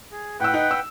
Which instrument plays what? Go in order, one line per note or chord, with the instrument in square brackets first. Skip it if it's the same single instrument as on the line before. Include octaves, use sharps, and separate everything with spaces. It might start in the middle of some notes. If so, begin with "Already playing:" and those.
[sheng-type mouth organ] G#4
[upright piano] A2 E6 [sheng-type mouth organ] B4 F#5 G5
[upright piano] D#4
E6